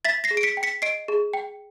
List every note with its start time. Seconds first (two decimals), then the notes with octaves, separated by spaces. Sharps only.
0.05 E5 A6 B6
0.24 A#6 C7
0.31 G#4
0.37 D7
0.43 B6 C#7
0.57 G5
0.63 B6 C#7
0.82 D#5 C7 D7
1.08 G#4
1.33 G5